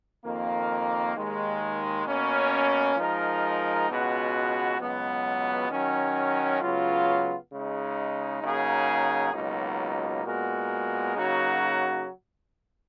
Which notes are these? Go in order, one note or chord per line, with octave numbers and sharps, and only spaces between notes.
F2 D#3 A#3
D#2 D#3 G#3
B2 A#3 C#4
F3 G#3 D#4 A#4
C#2 B2 G#3 B3 F#4
C#2 B2 F#3 B3
D#3 F#3 C#4
C#2 C#3 F#3 B3 F4
C#3 G#3 D#4
C#3 F#3 A#3 D#4 G#4
C#2 B2 F#3 A#3 D#4
A#2 G#3 B3 F#4 A#4
C#3 F#3 A#3 D#4 F#4